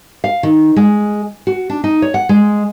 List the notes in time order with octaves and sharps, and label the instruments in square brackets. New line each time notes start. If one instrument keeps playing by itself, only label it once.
[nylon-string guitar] F5
D#3
G#3
F#4
D4
D#4
C#5
F#5
G#3